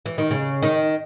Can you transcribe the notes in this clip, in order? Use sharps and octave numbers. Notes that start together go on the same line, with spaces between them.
E3
D#3
C#3
D#3